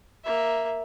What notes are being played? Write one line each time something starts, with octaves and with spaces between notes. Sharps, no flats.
A#3 E5